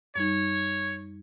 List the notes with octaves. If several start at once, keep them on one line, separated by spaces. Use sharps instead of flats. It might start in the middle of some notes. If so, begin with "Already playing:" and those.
F#2 G3 D#4 C#5